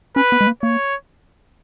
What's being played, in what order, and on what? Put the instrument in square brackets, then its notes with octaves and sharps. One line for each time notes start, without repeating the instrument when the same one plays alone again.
[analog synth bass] C#4 [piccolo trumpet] B4
[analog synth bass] B3
G#3
A#3
[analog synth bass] A#3 [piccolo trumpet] C#5